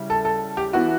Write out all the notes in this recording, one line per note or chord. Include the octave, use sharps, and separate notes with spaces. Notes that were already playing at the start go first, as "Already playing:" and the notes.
Already playing: C#3 G3 C#4 E4
A4
A4
G4
E3 B3 E4 F#4